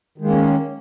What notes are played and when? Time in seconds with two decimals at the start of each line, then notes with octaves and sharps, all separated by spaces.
0.18 D#3
0.21 G#3
0.25 A#3
0.28 C#4